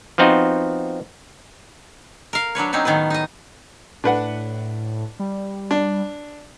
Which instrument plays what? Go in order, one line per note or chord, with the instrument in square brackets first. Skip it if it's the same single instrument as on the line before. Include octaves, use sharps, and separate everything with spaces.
[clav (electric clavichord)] F3 B3 C4 D#4 F4 F#4
[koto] A#4 F5
F#3 D4 B4 C#5
F#3 C4 C#4 D#4
A2 D#3 B3 C#4 B4
D#4 D#5
[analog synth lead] A2 [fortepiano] D4 B4 F#5
[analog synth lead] G3
[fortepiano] D4